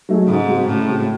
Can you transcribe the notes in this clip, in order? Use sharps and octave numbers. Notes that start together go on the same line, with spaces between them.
F#3 A3 D#4 G#4
G#2 C#3
G#3 C4 F#4
A2 C#3
G#3 C4 F#4